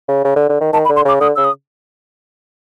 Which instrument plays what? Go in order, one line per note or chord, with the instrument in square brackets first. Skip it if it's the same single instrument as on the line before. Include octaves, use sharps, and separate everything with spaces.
[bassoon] C#3
C#3
D3
D3
D#3
[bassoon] D#3 [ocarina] A5
[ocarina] B5
[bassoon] D3
[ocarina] C6
[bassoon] C#3 [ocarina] D6
[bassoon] D3 [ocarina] D#6
[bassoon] C#3 [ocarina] E6
[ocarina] D#6